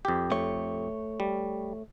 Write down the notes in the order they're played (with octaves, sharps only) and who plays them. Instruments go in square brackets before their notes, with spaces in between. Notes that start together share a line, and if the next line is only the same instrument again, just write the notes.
[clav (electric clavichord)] F2 G4
[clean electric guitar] A3 C#5
[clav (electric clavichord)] G3